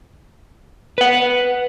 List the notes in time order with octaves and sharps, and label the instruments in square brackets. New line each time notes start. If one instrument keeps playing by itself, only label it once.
[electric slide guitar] B4 F#5